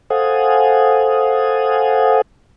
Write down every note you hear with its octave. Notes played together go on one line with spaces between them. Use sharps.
A4 C5 F5 F#5 G#5 D#6